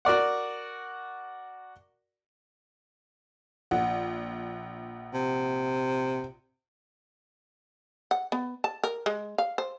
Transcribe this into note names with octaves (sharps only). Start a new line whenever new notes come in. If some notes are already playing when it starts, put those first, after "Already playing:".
F#4 A#4 D5 F#5
A#1 F#5
C3
F#5
B3
A5
A#4
G#3
F5
C5